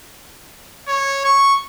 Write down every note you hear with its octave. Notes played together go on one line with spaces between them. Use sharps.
C#5
C#6